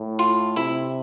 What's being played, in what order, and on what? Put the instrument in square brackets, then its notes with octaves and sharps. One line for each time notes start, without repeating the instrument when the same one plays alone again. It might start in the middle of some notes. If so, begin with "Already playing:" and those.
Already playing: [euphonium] A2
[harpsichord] F4
[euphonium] C3 [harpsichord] E4